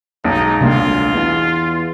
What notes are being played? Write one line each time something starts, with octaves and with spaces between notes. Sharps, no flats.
B1 G#2 D#4
D2 C3 G3 A#3 F4
E2